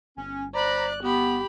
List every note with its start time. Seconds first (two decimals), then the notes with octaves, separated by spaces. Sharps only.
0.17 G1 C#4
0.55 C5 D5 A#5 B5 F#6
1.03 B3 G4 B5